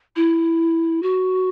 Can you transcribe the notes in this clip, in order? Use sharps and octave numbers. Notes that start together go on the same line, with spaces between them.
E4
F#4